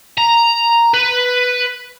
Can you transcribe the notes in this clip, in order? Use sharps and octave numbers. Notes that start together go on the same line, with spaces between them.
A#5
B4